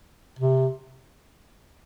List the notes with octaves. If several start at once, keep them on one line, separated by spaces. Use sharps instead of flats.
C3